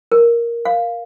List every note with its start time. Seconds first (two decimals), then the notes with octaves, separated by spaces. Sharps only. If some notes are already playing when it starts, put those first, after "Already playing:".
0.12 A#4
0.65 F5